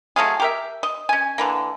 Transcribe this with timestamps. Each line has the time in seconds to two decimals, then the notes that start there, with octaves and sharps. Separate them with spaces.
0.16 F#3 A3 F4 G#4
0.40 G4 A#4 E5
0.83 D#5
1.09 C#4 G#5
1.38 D3 E3 A#3